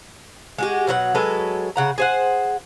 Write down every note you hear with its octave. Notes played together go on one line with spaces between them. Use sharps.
G#3 F#4 G4
B2 F#3 A#4 F#5
F#3 G#3 A4 B4
C#3 F#5 A#5
G#4 C5 F#5